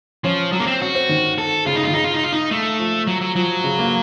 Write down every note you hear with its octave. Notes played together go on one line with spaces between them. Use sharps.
F3 C#4
F#3
A#3
C4
C#4 F#4
C4
D#3
A4
C#3 F4
D#4
D#3 F4
C#3 D#4
F4
D#4
F4
D#4
A3
F3
F#3
F#3
F3 F#3
C#3
A#3